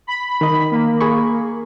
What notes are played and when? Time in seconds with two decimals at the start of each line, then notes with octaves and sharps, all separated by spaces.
0.07 B5
0.41 D#3 D#5
0.71 A#3
1.01 G#4 B5 C#6